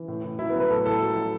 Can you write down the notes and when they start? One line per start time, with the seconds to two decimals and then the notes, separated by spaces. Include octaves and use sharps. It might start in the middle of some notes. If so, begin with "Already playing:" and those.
Already playing: E3
0.08 A2
0.24 A2
0.39 F#3 E4
0.50 B3
0.54 F#3
0.60 B4
0.70 A2 A4
0.86 A2 A4
1.01 F#3
1.17 F#3